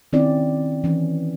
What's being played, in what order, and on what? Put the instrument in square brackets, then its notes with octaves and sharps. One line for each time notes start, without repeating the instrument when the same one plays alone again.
[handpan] D#3 C4 C#4 E4 D5
E3 C#4